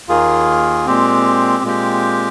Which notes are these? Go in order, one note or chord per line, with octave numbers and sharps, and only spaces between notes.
D#2 D#3 A#3 F4 G#4
A#2 G#3 C4 G4
A#2 G#3 C4 G4